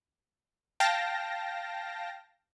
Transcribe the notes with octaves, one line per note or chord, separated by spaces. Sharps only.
F5 G5 A5 A#6